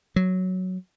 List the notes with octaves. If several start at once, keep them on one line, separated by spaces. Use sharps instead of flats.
F#3